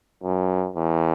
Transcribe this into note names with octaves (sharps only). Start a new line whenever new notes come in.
F#2
E2